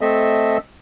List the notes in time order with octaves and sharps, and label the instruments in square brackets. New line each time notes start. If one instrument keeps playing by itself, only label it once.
[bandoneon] A3 C4 A4 D#5 E5